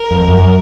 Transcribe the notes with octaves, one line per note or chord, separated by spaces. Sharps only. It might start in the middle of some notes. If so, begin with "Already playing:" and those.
Already playing: A#4
F2
F#2